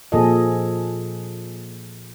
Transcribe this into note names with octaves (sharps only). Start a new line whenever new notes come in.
A#2 F3 G#4 A4 D#5